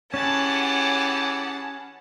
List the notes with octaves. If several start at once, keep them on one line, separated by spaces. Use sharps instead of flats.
E3 C#4 G4 G#4 F#5 G#5 A5